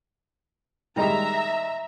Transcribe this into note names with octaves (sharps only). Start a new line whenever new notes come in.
D#3 G3 G#3 E5 A#5